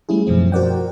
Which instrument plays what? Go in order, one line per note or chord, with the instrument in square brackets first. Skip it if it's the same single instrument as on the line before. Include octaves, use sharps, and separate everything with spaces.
[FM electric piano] G3 A3 C#4 E4 G#4
F#2 B2 F3 C4
F#4 A#4 C5 D5 F#5 G5